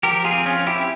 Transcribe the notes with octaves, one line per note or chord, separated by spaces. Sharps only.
F3 G4 A#4
F4 G#4
C4
C#4 F4
C4
E4 G4